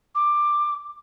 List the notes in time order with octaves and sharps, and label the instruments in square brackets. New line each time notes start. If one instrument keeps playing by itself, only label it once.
[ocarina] D6